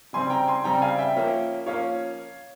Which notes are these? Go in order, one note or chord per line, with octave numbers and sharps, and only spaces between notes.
C#3 G3 C4 G#5 C6
G5 A#5
G#5 C6
C#3 G3 C4 G5 A#5
F5 G#5
E5 G5
F3 A#3 C#4
F3 A#3 C#4 C#5 F5